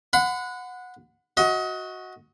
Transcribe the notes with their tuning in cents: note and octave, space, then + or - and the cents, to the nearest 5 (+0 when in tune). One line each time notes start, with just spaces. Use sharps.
F#5 -15 B5 +40
F#4 -5 D#5 +30